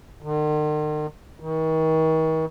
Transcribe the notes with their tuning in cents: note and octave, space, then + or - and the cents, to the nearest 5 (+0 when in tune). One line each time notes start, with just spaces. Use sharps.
D#3 -45
D#3 +40